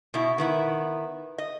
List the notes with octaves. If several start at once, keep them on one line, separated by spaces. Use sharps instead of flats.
B2 E4
D#3 B3 E4
D#5